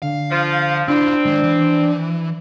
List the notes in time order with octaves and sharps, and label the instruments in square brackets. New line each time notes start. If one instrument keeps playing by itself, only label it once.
[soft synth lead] D3 [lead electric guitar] F5
[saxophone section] F3
[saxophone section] C4 [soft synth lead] D4 [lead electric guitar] E4 F4
[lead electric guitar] D#3 G#3
E3